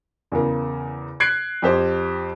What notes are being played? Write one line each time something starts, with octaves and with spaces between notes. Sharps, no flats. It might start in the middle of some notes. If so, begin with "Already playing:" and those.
E2 C#3 A#4
F#6 G#6 C7 D7
F2 G4 C5